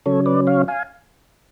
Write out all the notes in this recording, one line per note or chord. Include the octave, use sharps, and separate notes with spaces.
C#3 F#3 C#4 A4 C#5
B4 D5
C#5 F5
F5 G#5